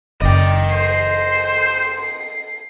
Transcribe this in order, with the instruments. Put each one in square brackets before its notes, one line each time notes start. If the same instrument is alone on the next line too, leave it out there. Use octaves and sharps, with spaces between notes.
[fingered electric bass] F#1 [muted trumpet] D5 [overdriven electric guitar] D#5 G5
[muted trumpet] C5 [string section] C7